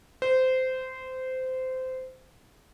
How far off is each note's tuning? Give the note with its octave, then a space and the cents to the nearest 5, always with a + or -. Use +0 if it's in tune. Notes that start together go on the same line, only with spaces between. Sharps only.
C5 -20